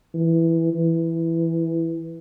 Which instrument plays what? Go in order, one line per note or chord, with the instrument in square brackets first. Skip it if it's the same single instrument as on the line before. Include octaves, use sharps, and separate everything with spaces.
[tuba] E3
E3